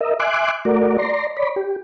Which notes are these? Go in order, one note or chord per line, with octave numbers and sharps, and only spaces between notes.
A#4 D#5 E5
E5 G#5 C6 D6 F#6
A3 F#4 A#4 D5
D5 A#5 C6
C#5 D5 B5
G4